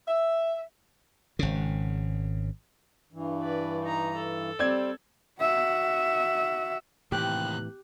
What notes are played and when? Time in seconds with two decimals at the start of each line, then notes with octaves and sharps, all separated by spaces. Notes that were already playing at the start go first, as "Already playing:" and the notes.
0.08 E5
1.39 G#1 C#3
3.12 G2 E3
3.41 B4 D5
3.82 D#4 A#5
4.16 A4
4.59 G3 C4 D5 G#6
5.40 F#4 E5
7.12 D#2 A2 C3 E3 G4 F#6